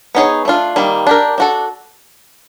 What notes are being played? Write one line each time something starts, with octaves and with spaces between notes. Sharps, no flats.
B3 D#4 G#4 C#5
A3 D4 F4
D#3 G3 A#3
D4 G4 A#4
D4 F#4 A4